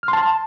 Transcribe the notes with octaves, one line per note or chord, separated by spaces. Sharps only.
F6
C6
A5